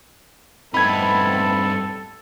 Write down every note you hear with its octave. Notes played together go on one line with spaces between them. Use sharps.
G2 A3 B3 C4 D#4 A4 B5 G#6